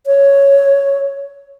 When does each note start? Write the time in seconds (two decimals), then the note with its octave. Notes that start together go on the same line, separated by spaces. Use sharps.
0.06 C#5